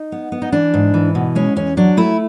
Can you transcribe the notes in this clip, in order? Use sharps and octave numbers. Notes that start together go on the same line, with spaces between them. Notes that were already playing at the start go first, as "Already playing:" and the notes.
Already playing: D#4
B3
B3
D#4
E3 D4
G#2
E3
B2
G#3 C#4
E2 C#4
F#3 D4
A3 E4